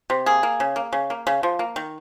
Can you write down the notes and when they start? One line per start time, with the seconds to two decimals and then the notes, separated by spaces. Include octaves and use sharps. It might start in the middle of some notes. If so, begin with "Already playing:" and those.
0.10 C3
0.26 A#3 G#4
0.43 A#3
0.60 C#3
0.76 A#3
0.93 C#3
1.10 A#3
1.27 C#3
1.43 F3
1.59 A#3
1.76 D#3